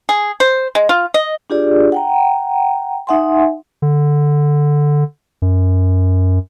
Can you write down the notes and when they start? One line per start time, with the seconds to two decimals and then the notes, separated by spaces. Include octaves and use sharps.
0.09 G#4
0.40 C5
0.75 G#3
0.89 F4
1.14 D#5
1.50 D4 F4 G4 G#4 D5
1.92 F#5 G5 A#5
3.07 D#4 E5 F#5 G#5 C6
3.82 D3
5.42 F#2